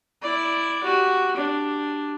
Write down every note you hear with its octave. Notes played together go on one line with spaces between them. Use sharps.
E4 D5
F#4 G4
D4 G4